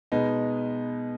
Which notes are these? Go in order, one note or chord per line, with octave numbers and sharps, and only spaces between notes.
B2 G#3 B3 D#4